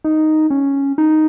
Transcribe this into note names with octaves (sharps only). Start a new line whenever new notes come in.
D#4
C#4
D#4